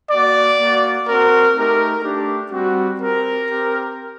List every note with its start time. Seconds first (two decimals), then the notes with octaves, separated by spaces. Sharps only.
0.10 A#3 F#4 D5
0.58 A#3 F#4
1.07 C4 F#4 A#4
1.56 A3 D#4 G4 A#4
2.03 A3 D4 G4
2.51 G3 C4 F#4
3.00 C4 G4 A#4
3.48 C4 G4